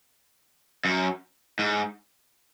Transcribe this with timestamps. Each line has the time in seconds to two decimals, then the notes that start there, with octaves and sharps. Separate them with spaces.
0.85 F#2
1.59 G#2